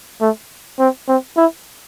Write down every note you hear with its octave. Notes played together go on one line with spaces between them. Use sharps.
A3
C4
C4
E4